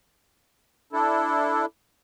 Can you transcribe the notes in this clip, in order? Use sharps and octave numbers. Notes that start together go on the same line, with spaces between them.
D4 E4 A4